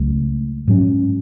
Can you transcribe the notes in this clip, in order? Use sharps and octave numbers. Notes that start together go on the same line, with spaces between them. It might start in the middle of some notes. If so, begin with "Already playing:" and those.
Already playing: C#2 C#3 F#3 A3
G#2 F#3 C#4